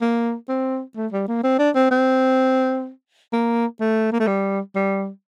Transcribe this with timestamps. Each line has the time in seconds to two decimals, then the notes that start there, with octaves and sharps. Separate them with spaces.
0.01 A#3
0.48 C4
0.96 A3
1.12 G3
1.28 A#3
1.43 C4
1.59 D4
1.75 C4
1.91 C4
3.33 A#3
3.80 A3
4.12 A#3
4.19 A3
4.27 G3
4.75 G3